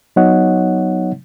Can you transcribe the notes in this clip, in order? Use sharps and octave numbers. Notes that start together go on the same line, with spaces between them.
F#3 B3 D#4 C#5 D#5 F#5